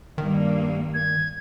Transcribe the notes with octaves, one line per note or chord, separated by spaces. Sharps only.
G2 D#3 A#3
G#6